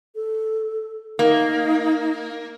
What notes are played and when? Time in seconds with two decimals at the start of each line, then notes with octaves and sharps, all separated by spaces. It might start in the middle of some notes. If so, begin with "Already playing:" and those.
0.15 A4
1.19 A#3 D#4